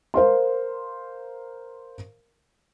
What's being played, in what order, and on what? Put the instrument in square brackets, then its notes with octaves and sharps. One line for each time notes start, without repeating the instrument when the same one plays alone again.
[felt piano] A#4 C5 F5 C6